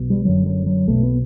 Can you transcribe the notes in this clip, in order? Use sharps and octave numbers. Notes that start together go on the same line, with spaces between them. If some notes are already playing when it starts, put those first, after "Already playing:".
Already playing: B1 B2
G3
F#1 F#2 D3 F#3
F#3
F#3
B1 B2 A3
B3